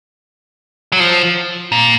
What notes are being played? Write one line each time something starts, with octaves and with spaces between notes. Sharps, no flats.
F#3
F3
A#2